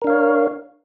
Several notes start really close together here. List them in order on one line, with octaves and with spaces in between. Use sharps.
A#4 D4 F5 C#5